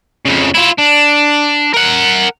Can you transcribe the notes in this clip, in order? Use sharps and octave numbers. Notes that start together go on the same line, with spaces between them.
F2 C#3
E4 F4
D4
A#4 F#5